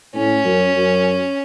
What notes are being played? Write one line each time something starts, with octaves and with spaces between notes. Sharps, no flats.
A2 C#4
F#2
F#2